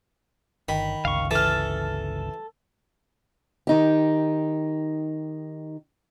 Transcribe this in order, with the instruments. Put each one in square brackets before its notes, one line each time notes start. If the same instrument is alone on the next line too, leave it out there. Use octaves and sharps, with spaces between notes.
[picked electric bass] G1 [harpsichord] D#3 [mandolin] B5
[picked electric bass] G1 C#2 [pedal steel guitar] F5 C#6
[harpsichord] E3 [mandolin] A4 F6 [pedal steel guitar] A5
[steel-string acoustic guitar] D#3 D#4 G4